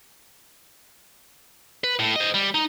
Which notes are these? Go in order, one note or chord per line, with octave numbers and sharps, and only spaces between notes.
B4
A2
C5 D#5
G3
D#4